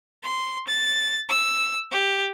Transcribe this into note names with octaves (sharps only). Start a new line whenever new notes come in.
C6
A6
E6
G4